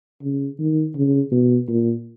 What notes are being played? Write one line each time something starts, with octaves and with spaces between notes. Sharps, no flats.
C#3
D#3
C#3
B2
A#2